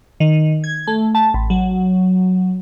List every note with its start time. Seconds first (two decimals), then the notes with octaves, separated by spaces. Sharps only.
0.20 D#3
0.64 G#6
0.87 A3
1.15 A5
1.34 A1
1.50 F#3